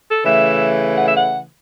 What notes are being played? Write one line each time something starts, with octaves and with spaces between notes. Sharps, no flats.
A4
C#3 E3 A3 E5
F#5
E5
F#5